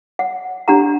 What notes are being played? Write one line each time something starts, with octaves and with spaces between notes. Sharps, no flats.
F#5
D4 G4 F#5 A#5